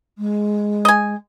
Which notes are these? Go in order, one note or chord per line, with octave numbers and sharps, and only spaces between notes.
G#3
D#5 G#5